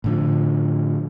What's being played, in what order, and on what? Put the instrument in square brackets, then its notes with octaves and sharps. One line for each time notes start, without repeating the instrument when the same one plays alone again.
[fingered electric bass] A2 D3 F3